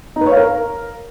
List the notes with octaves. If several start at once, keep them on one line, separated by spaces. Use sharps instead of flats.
D#4
B4
C#5
F5
A#4